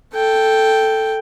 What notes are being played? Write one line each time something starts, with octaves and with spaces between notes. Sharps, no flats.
A4 G5